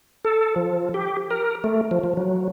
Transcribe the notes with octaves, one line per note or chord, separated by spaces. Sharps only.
A4
F3
G4
A#4
A3
F3
F3
F#3